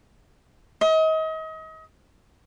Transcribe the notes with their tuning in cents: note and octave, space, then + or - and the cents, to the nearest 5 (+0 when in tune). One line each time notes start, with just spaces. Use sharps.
D#5 +35